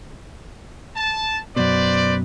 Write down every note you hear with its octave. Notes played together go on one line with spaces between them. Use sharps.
A5
F#2 B2 B4 C5 D5